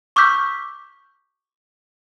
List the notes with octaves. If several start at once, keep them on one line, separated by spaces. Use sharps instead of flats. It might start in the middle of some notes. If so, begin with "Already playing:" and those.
C#6 D6 E6 F6 G6 B6